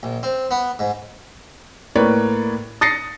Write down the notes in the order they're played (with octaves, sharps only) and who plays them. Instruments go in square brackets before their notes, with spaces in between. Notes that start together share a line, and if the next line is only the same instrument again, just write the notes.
[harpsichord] A#1
C4
B3
G#2
[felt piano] A2 A#3 B4 C#5 D5
D#6 A6 A#6 C7 C#7